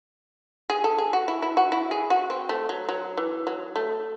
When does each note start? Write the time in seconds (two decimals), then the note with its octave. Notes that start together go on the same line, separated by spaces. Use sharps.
0.70 G#4
0.84 A4
0.98 G#4
1.13 F#4
1.28 E4
1.42 E4
1.57 F#4
1.72 E4
1.91 G#4
2.10 F#4
2.30 C4
2.49 A3
2.69 F#3
2.89 F#3
3.17 E3
3.47 F#3
3.76 A3